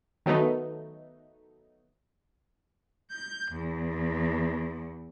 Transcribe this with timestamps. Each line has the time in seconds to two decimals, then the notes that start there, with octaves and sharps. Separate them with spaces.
0.26 D#3 F#3 A3 B3 D#4
3.11 G6
3.53 E2